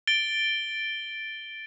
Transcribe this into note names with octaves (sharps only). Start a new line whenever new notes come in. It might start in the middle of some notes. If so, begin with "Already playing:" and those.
A6 D7 G7